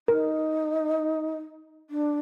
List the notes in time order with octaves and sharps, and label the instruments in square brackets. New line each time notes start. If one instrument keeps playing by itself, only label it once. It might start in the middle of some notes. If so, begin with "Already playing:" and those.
[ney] D#4 [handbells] A#4
[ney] D4